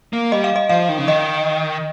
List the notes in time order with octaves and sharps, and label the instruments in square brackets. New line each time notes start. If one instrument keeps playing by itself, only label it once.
[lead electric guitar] A#3
[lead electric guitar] G3 [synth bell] D#5
[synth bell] F5
D#5
[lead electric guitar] F3 [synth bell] F5
[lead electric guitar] D#3
C#3
[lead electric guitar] D#3 [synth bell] D#5